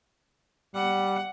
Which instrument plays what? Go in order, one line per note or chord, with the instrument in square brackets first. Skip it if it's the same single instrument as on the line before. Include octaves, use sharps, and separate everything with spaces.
[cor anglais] G3 [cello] F#5